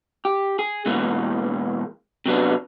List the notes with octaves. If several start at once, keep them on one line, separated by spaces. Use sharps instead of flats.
G4
G#4
B2 E3 G#3 A#3
C3 F#3 B3 D4